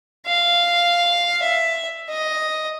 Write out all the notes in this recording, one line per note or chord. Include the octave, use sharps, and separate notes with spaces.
F5
E5
D#5